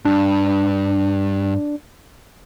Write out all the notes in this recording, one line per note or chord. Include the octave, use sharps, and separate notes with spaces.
G2 D4